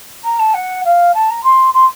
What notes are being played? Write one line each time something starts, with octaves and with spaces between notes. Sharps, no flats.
A#5
A5
F#5
F5
A5
A#5
C6
C6